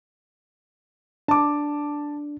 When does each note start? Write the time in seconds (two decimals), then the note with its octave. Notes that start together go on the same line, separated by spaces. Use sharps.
1.28 D4 A5 D6